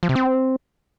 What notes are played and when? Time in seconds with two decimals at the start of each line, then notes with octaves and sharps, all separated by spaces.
0.03 F3
0.09 C3
0.16 C4